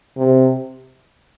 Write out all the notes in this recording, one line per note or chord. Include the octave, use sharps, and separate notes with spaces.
C3